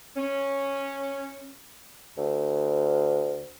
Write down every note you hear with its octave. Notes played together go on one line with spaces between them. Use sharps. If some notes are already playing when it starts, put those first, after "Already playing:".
C#4
D2